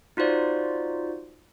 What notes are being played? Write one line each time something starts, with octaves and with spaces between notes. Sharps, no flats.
D#4 F4 F#4 C5 D5